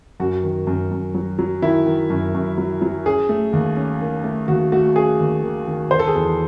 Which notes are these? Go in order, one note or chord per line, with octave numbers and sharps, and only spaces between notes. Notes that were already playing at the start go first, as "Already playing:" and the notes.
F#2 F#4
D#3
F#2
F#2
F#3
F#3
D#3 E4
D#3
F#2
F#2
F#3
F#3
C#4 G#4
A3
D#2
C#4
D#3
A3
D#2 F#4
A3 F#4
C#4 G#4
D#2
D#3
D#3
D#3 C5
A4
G#4
E2 A4